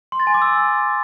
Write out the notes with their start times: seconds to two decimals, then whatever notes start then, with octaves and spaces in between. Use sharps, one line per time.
0.12 C6
0.20 A6
0.27 G#5
0.34 D6
0.42 E6